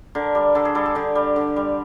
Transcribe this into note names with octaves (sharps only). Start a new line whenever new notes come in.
D3 A#4
G3
D3 A4
G#4
G3 A4
G#4
D3 G4
G3
D3
G3